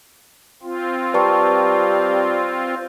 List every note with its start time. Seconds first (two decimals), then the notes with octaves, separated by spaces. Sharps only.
0.63 C4 F4
1.14 G3 B4 A5 C#6